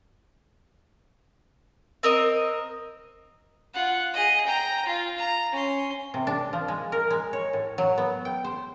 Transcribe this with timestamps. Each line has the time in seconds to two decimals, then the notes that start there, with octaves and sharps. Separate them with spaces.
2.03 C4 A#4 D#5
3.74 F4 F#5
4.14 G#4 D#5
4.46 G5 A#5
4.86 F4
5.18 A#5
5.52 C#4 C6
6.14 C3
6.27 D4
6.53 F3
6.68 G#3
6.92 A#4
7.10 G#3
7.33 C#5
7.53 A2
7.78 F#3
7.98 B3
8.25 G5
8.44 C5